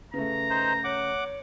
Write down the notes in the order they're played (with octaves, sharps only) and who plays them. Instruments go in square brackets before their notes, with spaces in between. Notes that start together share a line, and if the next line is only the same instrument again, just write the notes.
[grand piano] C#3 A3 [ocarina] B4 [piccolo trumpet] A#5
[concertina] D#4 C5
[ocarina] C#5 [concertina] F#5 D6